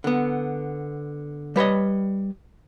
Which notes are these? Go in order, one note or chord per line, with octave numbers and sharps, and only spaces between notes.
D3 B3
G3 B4 C#5 D#5